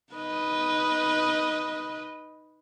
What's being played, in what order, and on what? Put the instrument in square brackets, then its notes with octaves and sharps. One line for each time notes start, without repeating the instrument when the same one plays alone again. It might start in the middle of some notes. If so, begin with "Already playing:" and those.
[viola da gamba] D#4 B4 D#5